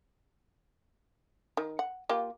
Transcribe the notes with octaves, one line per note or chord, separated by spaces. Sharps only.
D#3
F#5
A#3 F4 G4